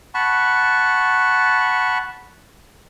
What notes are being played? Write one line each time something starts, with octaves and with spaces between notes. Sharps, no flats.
F#5 A5 B5 C#6